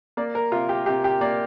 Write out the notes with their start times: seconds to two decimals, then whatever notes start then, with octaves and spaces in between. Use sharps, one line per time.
0.17 A#3 D5
0.35 A#4
0.52 C3 F4
0.69 G4
0.86 C3 G4
1.04 G4
1.21 A#3 D5